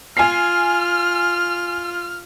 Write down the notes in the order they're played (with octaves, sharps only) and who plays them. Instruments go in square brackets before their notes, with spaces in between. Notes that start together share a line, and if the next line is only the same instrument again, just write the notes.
[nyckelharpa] F4 [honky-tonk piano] G#5 C7 [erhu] F6